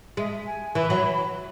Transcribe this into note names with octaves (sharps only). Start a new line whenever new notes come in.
G#3 E5
E5
G#5
E3 B5
F#3